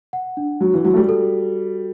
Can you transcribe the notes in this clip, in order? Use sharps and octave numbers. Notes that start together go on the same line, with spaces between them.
F#5
D4
F#3 F#4
E3
F#3 F#4
A3
G3
A4